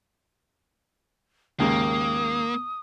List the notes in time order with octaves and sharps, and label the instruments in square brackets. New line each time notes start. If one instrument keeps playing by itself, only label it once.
[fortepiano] D#2 G#2 C#3 [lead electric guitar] A#3 [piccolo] D#6